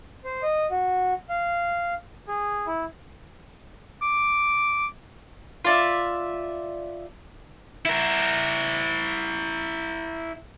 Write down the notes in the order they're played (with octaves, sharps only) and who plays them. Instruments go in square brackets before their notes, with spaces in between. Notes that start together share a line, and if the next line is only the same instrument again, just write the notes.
[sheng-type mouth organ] C5
D#5
F#4
F5
G#4
E4
[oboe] D6
[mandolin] F4 D5 E5
[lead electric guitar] E4 A#4